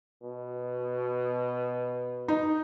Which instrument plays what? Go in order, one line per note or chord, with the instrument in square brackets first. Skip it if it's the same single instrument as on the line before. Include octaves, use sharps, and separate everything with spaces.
[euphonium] B2
[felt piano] D#4